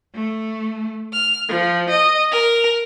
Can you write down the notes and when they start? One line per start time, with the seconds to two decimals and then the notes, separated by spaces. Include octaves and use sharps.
0.14 A3
1.12 F6
1.48 F3
1.89 D#5
2.30 A#4